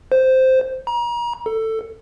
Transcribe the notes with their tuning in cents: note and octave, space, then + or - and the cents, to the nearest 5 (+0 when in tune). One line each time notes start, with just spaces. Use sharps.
C5 -5
A#5 +35
A4 +15